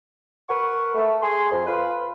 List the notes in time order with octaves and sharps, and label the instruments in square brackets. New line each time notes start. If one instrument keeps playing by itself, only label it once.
[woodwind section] A#4 B4 F#5 C#6
A3
G#4 C6
F2
F4 B4